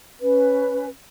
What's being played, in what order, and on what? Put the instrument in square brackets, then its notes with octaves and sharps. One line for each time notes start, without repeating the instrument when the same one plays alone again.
[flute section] C#4 B4